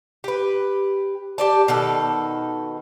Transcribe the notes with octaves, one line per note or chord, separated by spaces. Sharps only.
G4 B4
G4 D5 A5
B2 D#3 A4